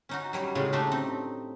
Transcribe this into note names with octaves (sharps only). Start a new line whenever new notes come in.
C#4 D#4 F#4
F#3 G3 C#5
A2 C#3 G#3
A3 D4 D#4 G4
C4 D#4